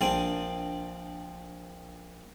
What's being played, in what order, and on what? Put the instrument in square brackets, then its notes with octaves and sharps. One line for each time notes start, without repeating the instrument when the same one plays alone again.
[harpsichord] A#1 C4 D4 G#5